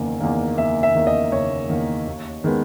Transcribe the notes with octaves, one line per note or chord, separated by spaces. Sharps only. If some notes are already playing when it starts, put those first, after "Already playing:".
Already playing: F#1 E2 D#3 A#3
E2 D#3 A#3
F#1 E5
E5
E2 D#3 A#3
D#5
F#1 C#5
E2 D#3 A#3
D#2
D#3 G#3 B3